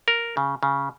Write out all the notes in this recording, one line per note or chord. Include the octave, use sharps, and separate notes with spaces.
A#4
C#3
C#3